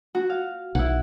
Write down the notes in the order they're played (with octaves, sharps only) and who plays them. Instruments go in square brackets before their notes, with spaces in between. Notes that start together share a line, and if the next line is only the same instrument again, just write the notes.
[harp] F#4
F5
[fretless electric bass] B1 [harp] E4 F#5